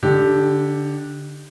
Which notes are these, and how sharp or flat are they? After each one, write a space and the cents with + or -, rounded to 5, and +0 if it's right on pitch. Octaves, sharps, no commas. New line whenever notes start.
D3 -10 D#4 -40 G4 +0